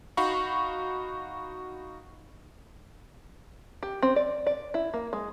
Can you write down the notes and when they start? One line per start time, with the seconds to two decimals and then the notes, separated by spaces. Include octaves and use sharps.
0.17 D#4 F#4 F5 B5 C#6
3.83 G4
4.03 C4
4.16 D5
4.47 D5
4.74 E4
4.94 A#3
5.13 G#3